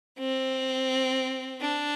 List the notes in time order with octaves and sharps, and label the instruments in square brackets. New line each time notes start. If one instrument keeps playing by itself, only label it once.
[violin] C4
D4